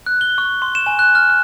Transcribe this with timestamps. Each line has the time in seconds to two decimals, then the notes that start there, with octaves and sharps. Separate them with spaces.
0.06 F#6
0.21 G7
0.38 C#6
0.62 C6
0.75 E7
0.86 G#5
0.99 F#6
1.15 F6
1.30 F6